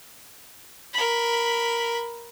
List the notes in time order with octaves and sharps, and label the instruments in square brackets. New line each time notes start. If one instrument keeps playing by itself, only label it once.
[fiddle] A#4 B5